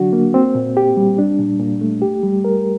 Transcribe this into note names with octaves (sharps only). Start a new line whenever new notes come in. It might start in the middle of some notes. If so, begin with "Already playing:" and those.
Already playing: D3 F#3 D4 F#4
A#3
C4
A#2
G4
G3
D4
A#2
A#2
A3
G4
G3
A#4